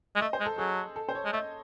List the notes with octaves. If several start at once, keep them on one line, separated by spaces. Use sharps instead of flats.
G#3
A3 D#5
C5
G#3
A4
F#3 G#4
A4
C5
C#5
G#3
A3 D#5